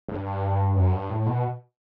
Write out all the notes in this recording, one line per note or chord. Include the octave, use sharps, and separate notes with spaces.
G2
F#2
G2
A2
B2